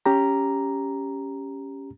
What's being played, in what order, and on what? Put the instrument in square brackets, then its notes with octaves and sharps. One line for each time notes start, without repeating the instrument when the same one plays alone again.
[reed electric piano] C#4 G4 A#5